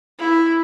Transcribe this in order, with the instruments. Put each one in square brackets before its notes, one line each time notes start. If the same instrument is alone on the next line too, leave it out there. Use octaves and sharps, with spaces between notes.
[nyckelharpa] E4